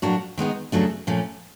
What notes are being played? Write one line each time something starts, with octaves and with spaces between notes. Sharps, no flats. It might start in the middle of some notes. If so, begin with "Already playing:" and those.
A2 F#3 A#3 D4 F#4
D#3 G#3 B3 D#4
E2 C#3 F#3 A3 D4
A#2 F3 A3 C#4